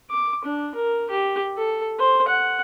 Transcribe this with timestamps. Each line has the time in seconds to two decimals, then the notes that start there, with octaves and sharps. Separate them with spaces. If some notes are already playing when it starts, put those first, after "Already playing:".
0.10 D6
0.45 D4
0.75 A#4
1.10 G4
1.57 A4
1.99 C5
2.28 F#5